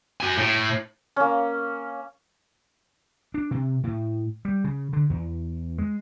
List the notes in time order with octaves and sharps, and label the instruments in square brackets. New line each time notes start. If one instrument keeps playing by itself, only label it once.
[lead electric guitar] F#4 G#5
A2
[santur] A#3 C#4
[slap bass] D4
C3
A2
G3
C#3
D3
E2
G#3